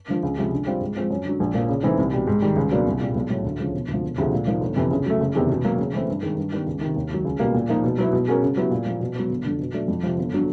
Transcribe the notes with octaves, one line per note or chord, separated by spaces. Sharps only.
D3 F3
C#2
C3 F3 G#3
D3
G3 C4 F4
G#2
F3 G#3 C4 F4
F#2
D3 F#3
A#1
A#2 F3 A#3
C#3
E3 A3 C4 D#4
C2
B2 G3
G#2
D#3 G3
C#2
B2 F#3 A#3 D4
C2
A#2 G3
B1
A2 F#3
D2
C#3 F3
E1
D2 C3 F3
E1
D2 C3 F3 G#3
A#2
F3 A#3 D#4
G1
F2 C3 E3
C#3
F#3 A3
F#1
E2 C3 D#3 G#3
B2
F#3 A#3
C#3
E3 A3 C4
G2
D#3 G#3
G2
D#3 G3 B3
C#2
C3 D#3
D#2
D#3 F#3
C#2
B2 G3 A#3
A#2
F3 A#3 D#4
B2
F#3 B3 E4
B2
G#3 C#4 F#4 A#4
C#3
F#3 B3 E4 G4
A#2
F3 A#3
B2
F#3 B3
G1
F2 D3
B2
F#3 A3 D4
F2
C3 F3
G1
D3 F#3